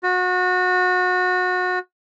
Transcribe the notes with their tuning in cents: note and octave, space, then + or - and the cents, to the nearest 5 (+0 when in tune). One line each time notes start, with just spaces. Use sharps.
F#4 -25